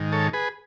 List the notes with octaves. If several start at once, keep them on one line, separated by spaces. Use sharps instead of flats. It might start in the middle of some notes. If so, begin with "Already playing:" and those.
Already playing: G#2 D#3
A4 C#5
G#4 B4